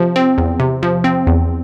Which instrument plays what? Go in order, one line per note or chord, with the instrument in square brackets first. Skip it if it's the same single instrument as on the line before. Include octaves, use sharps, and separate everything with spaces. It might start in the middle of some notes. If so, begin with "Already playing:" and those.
Already playing: [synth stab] C3 F3
C4
E2
C3
F3
C4
E2